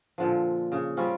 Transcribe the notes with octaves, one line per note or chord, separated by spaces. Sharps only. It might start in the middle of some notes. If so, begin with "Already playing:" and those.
A#2 D3 F3
C#3
G3 C4 C#4 F4